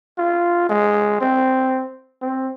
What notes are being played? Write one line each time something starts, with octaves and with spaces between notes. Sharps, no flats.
F4
G#3
C4
C4